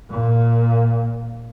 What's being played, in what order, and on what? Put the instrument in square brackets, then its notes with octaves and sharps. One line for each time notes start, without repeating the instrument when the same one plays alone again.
[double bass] A#2